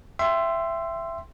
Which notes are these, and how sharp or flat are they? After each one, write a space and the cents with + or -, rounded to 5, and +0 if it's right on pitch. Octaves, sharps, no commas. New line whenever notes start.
E5 +20 G5 -15 C6 +0